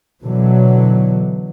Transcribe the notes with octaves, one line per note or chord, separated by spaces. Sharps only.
B2 D3 E3 F#3